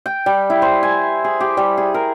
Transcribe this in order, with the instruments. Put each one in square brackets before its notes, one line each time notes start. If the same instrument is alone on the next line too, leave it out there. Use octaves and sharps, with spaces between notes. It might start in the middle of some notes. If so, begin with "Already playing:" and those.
[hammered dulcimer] G5
G3
E4
C5
G#5
G#4
G4
G3
G#4
A#4